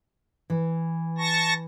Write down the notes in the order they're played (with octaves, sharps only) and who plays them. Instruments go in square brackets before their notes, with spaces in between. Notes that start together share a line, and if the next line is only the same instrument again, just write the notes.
[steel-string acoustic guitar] E3
[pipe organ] A5 C#6 A#6